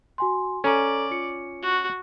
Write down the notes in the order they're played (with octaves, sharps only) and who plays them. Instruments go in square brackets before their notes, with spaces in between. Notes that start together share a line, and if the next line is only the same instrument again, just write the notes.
[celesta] F#4 G#5 C6
[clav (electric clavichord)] C#4 [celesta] A4 A#5 [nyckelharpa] D5
[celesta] F4 C#7
[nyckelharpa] F#4